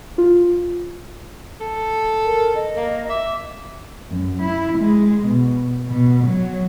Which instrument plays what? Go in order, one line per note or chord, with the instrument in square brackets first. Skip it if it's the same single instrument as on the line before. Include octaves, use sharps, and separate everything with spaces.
[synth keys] F4
[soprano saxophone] A4
[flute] A#4
D#5
[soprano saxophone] A#3
[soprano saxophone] E5 [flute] D6
[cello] F#2
E4
G#3
B2
B2
F#3